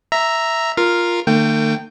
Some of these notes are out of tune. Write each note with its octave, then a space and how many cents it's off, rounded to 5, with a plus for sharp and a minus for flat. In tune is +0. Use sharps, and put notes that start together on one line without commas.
E5 +0 A#5 +0
F4 +0 A#4 +0 F5 +0
D#3 -45 A3 +45 G5 -5